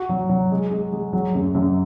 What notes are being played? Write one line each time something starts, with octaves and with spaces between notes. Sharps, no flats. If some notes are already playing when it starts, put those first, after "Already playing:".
Already playing: F#4
F#3
F#3
G#3
G#3
G#3
F#3
F#2
F#2